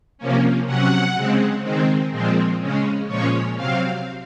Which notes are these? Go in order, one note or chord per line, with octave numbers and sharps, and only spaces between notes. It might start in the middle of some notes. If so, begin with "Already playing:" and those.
C3 F3 A#3 C#4
C3 F#3 C#4 F#5
C#3 G#3 C4
D#3 G#3 C4
A#2 F3 G#3 C4
C#3 G#3 C#4
A#2 F3 G#3 C#4 C#5
C3 F#3 C4 F5